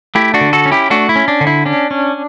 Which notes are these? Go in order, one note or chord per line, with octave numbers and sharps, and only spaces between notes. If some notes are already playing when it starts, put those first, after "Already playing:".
A3 E4 G4
D4 F#4
D3
F#4 A4
C#4
E4 G4
A3 D4 F#4
E4
C#4
D4
D3
E4
C#4 D4
C#4